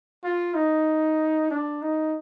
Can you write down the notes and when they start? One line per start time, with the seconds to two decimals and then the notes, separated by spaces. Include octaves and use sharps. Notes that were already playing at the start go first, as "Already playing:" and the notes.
0.24 F4
0.55 D#4
1.51 D4
1.82 D#4